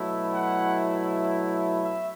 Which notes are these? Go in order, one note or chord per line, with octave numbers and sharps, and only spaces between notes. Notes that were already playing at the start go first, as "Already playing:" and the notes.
Already playing: B2 F#3 A3 E4
F#5
E5